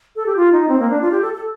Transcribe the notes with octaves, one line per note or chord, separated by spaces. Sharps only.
A4
G4
F4
D#4
C4
A#3
D4
F4
G4
A4
A4